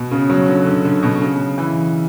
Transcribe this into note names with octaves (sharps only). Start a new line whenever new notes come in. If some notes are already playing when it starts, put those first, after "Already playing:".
Already playing: B2
C#3
F#3
D3
D3
D3
B2
C#3
E3